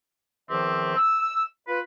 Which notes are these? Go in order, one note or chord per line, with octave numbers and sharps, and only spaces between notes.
E2 D#3 F3 C4 E5 D6
E6
F4 B4